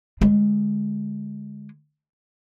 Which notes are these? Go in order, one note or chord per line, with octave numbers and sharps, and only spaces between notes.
D3 G#3